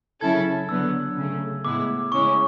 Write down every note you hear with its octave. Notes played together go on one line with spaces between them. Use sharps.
C#3 F#3 C#4 E4 A4 G#6
D3 F#3 B3 E6
C#3 F#3 A3
A2 G#3 B3 E4 D6
C#3 G#3 C#4 E4 C#6